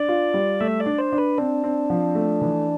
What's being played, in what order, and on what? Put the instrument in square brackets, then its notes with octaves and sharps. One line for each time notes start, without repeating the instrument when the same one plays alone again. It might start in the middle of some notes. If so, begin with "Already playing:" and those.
Already playing: [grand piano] D4 [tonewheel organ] D5
[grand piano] F4
G3
[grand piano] A3 [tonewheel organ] E5
[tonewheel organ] D5
[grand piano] D4
[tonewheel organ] C5
[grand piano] D4
[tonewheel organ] B4
[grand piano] C4 [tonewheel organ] D4
[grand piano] C4
F3
A3
E3